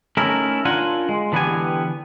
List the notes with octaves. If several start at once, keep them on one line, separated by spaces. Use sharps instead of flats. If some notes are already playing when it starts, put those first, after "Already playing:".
A3 C#4 D#4 E4 A4 A#4
D4 F4 A#4 F#5 G#5
G#3
D3 E3 B3 F#4 G4 G#5